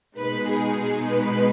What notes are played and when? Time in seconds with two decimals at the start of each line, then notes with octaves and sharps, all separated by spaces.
0.17 B2 G#3 D#4 B4
0.47 G#4
0.78 G#4
1.09 B4